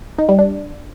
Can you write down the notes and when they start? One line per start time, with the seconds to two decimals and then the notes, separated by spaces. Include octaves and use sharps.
0.18 D#4
0.29 G3
0.39 D4